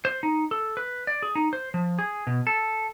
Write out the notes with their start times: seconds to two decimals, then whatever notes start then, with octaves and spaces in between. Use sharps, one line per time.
0.05 C5
0.23 D#4
0.51 A4
0.77 B4
1.07 D5
1.23 G#4
1.35 D#4
1.53 C5
1.74 F3
1.99 G#4
2.27 B2
2.47 A4